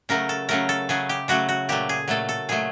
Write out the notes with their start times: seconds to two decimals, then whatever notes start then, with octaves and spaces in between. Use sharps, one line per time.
0.09 C#3 F#3 A3 A#4
0.29 A4
0.49 C#3 F#3 A3 A#4
0.69 A4
0.89 C#3 F#3 A3 G#4
1.09 G4
1.28 C#3 F#3 A3 F#4
1.49 F#4
1.69 A#2 F#3 A3 G4
1.89 G#4
2.08 A#2 F#3 A3 A4
2.29 A4
2.49 A#2 F#3 A3 G#4